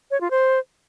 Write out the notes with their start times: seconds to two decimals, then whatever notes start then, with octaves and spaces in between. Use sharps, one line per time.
0.11 C#5
0.21 F4
0.31 C5